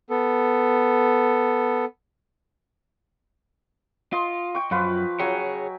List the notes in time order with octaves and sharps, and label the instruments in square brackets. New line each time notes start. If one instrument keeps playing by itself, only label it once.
[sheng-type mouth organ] B3 A4
[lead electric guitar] F4 [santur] D#5 C6
[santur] G5 C#6
[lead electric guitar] F#2 [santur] F3 F4 B4
[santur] F#3 G5 G#5 [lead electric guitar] G#4 C#5